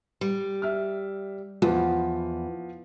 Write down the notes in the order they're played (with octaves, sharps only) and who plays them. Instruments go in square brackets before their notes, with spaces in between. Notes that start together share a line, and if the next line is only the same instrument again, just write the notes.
[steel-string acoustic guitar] G3
[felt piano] E5 F6
[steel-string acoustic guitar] E2 [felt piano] F3 B3